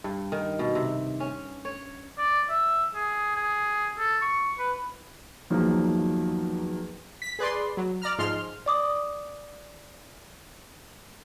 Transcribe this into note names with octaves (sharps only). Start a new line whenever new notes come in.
G2
D#3
B2
C3
C#4
C#5
D5
E5
G#4
G#4
A4
C#6
B4
E2 D#3 F3 F#3 A#3
B6
G#4 B4 D5 C6
F#3
D5 A#5 F6
G#2 F3 G#3 C6 F6
D5 D6 D#6